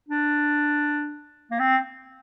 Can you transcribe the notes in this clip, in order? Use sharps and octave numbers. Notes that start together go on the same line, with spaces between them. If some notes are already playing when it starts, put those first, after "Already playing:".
D4
A#3
C4